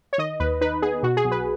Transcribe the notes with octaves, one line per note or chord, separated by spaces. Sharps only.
C#5
D#3 D#5
D#2 B4
D#4 B4
B3 G#4
B2 F#4
G#4
B1
B4